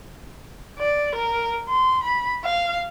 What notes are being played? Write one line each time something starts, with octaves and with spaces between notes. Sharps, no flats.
D5
A#4
C6
B5
F5